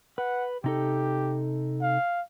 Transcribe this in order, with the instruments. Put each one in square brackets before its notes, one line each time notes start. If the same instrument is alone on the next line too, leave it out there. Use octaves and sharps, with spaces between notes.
[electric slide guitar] B4 [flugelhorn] F#5
[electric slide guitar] C3 D#4 A4 [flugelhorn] G4
[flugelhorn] F5